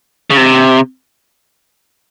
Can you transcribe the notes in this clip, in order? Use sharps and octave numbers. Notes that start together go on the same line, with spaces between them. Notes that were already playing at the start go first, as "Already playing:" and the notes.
C#3
C3